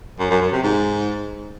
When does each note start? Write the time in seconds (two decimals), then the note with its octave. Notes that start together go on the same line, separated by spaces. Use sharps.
0.19 F#2
0.30 F#2
0.41 F#2
0.52 C3
0.63 G#2